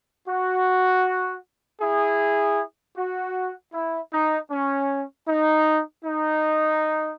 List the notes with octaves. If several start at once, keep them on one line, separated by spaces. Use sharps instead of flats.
F#4
E4 G#4
F#4
E4
D#4
C#4
D#4
D#4